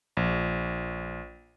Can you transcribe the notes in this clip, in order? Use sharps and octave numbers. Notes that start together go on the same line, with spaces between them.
A#1